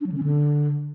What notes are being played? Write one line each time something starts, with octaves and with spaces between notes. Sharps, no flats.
D4
F#3
D3
C#4
D3